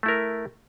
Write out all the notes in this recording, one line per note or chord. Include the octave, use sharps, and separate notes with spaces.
A3 E4 A#4